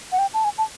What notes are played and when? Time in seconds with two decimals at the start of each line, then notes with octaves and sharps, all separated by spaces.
0.12 F#5
0.19 G5
0.34 A5
0.44 G#5
0.58 A5